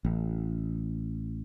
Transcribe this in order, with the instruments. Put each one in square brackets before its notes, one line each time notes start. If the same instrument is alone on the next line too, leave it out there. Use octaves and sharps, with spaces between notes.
[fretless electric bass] A1